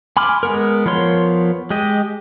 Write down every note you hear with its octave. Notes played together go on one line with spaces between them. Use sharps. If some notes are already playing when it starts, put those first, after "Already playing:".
G#5 B5 C6 D6 F6
G#3 B3 A#4
F3 B3 A#4 C#5 C6
G#3 G4 D#5